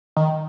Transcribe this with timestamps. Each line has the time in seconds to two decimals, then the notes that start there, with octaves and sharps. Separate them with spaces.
0.16 D#3